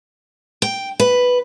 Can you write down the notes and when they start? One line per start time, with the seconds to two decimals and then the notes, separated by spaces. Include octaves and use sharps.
0.62 G5
1.00 B4